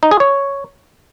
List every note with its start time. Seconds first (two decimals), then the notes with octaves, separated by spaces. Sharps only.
0.03 D#4
0.11 G#4
0.20 C#5